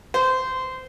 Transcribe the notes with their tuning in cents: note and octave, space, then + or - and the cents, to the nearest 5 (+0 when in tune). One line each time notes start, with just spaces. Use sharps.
C5 -20